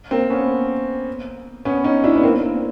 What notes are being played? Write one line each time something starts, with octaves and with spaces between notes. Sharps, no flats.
A#3 C4
B3 C#4
B3 C#4
C#4 D#4
D4 E4
B3
A#3 C4